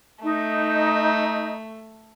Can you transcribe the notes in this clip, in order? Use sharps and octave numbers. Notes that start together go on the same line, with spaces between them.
A3 D#4